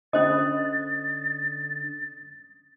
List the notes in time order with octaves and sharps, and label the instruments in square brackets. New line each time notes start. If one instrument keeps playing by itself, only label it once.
[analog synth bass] D3 [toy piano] C#4 C5 D#5 [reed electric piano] D#6 [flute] A6